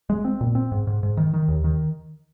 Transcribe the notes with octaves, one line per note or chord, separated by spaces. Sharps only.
G#3
C4
A#2
C4
G#2
G#2
G#2
D#3
D#3
D#2
D#3